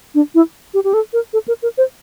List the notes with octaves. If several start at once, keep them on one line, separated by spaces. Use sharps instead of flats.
D4
E4
G4
G4
A4
A#4
A4
A#4
A#4
C5